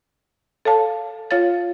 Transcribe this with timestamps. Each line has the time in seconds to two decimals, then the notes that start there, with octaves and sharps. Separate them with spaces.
0.65 A4 C#5 F5 A5
1.31 F4 C#5 F5 A6